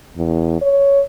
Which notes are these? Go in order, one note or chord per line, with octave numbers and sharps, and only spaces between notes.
E2
C#5